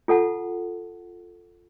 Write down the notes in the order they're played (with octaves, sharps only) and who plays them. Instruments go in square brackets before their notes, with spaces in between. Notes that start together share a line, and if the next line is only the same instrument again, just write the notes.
[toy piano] F4 A4 F#5 A5